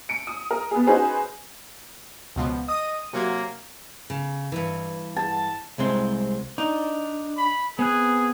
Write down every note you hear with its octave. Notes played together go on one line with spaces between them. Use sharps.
C#7 D7
D#6
A#4
B3 G#4
C#4 D#4 F#4 G#4 B4 C5
C#2 B2 F3
D#5 D#6 D#7
C3 F#3 A#3 G#6
C#3
G2 E3
A5
C2 G#3 C4
D4 D#4
B5
B3 C4 G#4 F#6